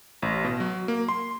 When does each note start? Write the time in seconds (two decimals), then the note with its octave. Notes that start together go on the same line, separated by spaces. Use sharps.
0.22 A1
0.44 B2
0.60 F#3
0.88 A#3
1.09 C6